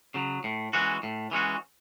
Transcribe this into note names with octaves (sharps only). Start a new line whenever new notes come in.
C#3 F#3
A2
E3 G#3 C#4 F#4
A2
E3 G#3 C#4 F#4